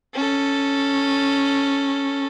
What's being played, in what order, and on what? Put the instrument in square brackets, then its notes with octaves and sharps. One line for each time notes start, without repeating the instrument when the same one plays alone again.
[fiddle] C#4 A4